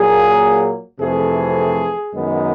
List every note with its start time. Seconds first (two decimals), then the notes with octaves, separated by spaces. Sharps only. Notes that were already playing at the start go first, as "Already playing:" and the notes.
Already playing: A#2 F#3 A#3 G#4
0.99 F2 C3 E3 A3 G#4
2.14 F#2 D#3 G#3 B3